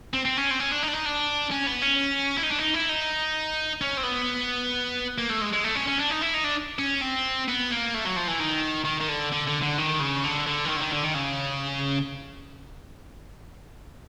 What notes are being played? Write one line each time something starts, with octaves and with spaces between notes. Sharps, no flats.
C4
C4
C#4
C4
C#4
D4
D#4
D4
D#4
D4
C#4
B3
C#4
E4
D#4
D4
D#4
E4
D#4
C#4
C4
B3
A#3
A3
G#3
G#3
A3
C#4
C#4
D4
D#4
E4
D#4
D4
C#4
C4
B3
A#3
A3
F#3
F3
E3
D#3
D#3
D#3
D3
D3
D3
D3
D#3
C#3
D3
D3
E3
D#3
D3
D#3
D3
D#3
C#3